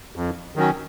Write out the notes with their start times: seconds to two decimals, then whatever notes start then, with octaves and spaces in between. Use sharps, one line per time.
0.16 F2
0.56 D#3 F#3 C#4